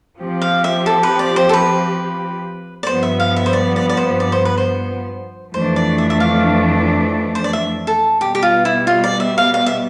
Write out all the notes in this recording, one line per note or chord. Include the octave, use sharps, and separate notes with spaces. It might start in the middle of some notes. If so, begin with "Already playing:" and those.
F3 C4 G4
F5
E5
A4
B4
D5
C5
A4
B4
D5
G2 F3 B3 C5
E5
F5
E5
C5
D5
D5
D5
C5
D5
C5
B4
C5
F2 E3 A3 D4 C5
D5
E5
E5
F5
C5
D5
E5
A4
B2 G3 B3 G4
G4
F4
E4
F4
D5
E5
F5
F5
E5